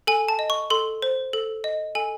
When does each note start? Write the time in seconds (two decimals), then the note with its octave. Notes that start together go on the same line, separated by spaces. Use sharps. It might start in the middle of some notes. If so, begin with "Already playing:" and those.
0.07 A4 G#5
0.28 A5
0.39 D#5
0.50 C#6
0.70 A4 C6
1.02 C5
1.33 A4
1.64 D#5
1.95 A4 G#5